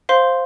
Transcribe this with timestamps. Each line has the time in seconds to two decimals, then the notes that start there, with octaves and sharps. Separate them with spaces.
0.09 C5 F5 C6